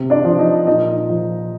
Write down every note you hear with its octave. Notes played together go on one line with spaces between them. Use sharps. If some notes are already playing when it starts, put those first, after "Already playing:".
Already playing: C3
D4 D5
F3
D#4 D#5
A#2 D#4 D#5
F3